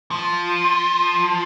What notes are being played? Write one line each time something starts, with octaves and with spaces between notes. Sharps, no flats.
F3